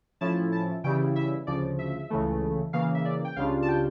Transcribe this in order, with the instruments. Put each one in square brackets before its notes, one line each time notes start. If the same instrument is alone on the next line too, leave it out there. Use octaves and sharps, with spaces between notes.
[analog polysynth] A2 F3 C#4 E4 A5
A5
C#3 E3 G3 C#4 E4 G5
E5
D2 C#3 F3 D5
E5
C#2 C#3 E3 A3
C#3 E3 A#3 F5
E5
D5
G5
C#2 C#3 G3 D4 F4 F5
A5
G5